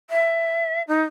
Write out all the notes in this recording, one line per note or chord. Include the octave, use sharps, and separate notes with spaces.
E5
D#4